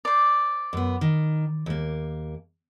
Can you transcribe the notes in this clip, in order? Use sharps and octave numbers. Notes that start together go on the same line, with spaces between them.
C5 D5
F#2 B3
D#3
D#2 A#3